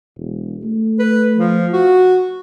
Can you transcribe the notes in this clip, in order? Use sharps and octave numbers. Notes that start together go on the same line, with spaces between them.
E1
A3
B4
F3
F#4